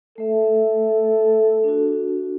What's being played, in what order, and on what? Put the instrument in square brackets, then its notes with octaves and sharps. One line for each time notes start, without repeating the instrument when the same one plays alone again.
[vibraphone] A3 E5 [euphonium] A4
[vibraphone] D4 F#4